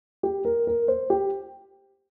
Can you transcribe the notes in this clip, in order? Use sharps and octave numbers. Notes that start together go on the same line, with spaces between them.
G4
A#4
A#4
C5
G4